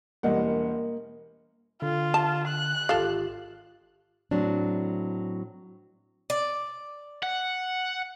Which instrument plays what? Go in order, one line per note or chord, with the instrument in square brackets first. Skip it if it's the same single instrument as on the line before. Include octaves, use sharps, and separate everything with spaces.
[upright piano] E1 G3 F#5 [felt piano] A#3 D#5
[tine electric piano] D3 [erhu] F4
[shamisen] A5
[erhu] F#6
[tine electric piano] G#1 F4 G4 [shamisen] A4 F5
[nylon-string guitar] A2 F#3 C4 D4
[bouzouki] D5
[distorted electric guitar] F#5